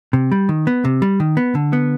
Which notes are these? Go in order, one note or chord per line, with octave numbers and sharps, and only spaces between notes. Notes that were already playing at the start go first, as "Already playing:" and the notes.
C3
G3
D#3
B3
C3
G3
D#3
B3
D3
B3